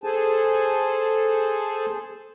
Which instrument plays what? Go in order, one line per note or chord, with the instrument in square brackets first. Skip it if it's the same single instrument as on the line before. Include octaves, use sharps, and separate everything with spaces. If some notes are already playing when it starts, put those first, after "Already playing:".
[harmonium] G#4 A4 C5 G#5 A5